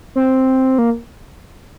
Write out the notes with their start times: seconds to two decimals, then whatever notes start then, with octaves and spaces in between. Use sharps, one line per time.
0.15 C4
0.78 A#3